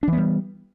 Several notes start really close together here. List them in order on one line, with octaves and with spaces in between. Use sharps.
D4 E3 B3 G3